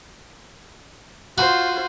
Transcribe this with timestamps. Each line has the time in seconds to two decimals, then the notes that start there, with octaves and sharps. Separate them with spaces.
1.38 F4 F#4 C5